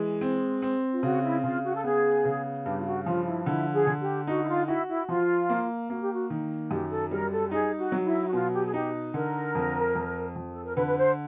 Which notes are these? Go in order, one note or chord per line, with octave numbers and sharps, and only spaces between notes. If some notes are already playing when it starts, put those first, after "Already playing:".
Already playing: E3 G#3
C4
C4
F4
C#3 F#4
E4
C#3 F4
F#4
A4
B3 G#4
C#3
G2 G4
F4
F#4
F3 F4
E4
D3 E4
G#4
D3
G4
D#4 F#4
E4
F4
E4 F#4
E4
F3 F4
A#3
A#3 F#4
G4
F#4
D#3
F#2 G4
A4
G3 A#4
A4
G4
D#4 G#4
F#4
F#3
E4
F#4
B2 F4
G4
G#4
D#4 G4
D3 A#4
F2
F2
F2
A4
A#4
D3 B4
B4
C5